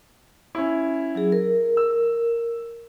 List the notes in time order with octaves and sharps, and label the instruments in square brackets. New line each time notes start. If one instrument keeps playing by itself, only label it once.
[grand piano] C#4 E4
[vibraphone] F#3 G#4
A#4
[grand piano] E6